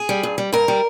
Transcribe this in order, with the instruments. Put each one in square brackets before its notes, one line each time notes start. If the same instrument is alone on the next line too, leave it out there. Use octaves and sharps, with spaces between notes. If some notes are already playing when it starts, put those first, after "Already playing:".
Already playing: [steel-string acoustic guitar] G#4
G3
G2
G3
G2 A#4
G3